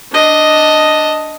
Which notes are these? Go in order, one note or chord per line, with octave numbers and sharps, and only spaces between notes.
D4 D#5